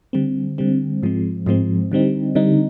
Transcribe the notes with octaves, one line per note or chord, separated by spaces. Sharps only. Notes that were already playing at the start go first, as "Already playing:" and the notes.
D3 G3 C4
D3 G3 C4
G#2 F3 G#3 C4
G#2 F3 G#3 C4
D3 G3 C4 D#4
D3 G3 C4 D#4